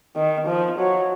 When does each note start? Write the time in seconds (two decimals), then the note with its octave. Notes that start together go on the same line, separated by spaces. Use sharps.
0.16 D#3
0.47 F3
0.78 F#3